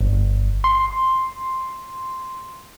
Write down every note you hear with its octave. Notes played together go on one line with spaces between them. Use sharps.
G1
C6